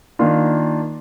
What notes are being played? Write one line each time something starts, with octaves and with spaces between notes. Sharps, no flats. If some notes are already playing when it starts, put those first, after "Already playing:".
D#3 A#3 D4 F4